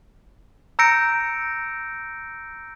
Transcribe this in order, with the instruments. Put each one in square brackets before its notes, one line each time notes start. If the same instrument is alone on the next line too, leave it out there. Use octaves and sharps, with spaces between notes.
[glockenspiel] A#5 E6 G6 A#6 C#7 D7